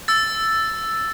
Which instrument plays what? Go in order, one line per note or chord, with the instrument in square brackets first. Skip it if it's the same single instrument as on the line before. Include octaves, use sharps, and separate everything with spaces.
[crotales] E6 A6